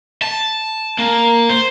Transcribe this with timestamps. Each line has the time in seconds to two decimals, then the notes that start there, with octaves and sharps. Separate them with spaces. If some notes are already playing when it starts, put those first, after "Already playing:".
0.22 A5
0.99 A#3
1.49 C5